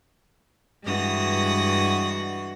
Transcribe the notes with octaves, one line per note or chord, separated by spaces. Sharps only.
G2 E3 G#3 F#4 D#6 A#6